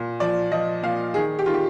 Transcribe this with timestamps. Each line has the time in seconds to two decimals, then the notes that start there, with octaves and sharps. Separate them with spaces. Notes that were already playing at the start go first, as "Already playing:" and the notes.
Already playing: A#2
0.20 F3 D5
0.51 F3 D#5
0.83 A#2 F5
1.14 D#3 G#4
1.39 G4
1.46 D#3 F4
1.54 G4